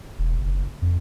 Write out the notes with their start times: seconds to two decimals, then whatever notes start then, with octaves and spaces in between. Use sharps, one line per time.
0.18 E1
0.38 F#1
0.81 F2